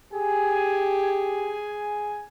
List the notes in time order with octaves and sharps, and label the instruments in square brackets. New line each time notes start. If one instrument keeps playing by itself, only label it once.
[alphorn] G4 [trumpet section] G#4 G#5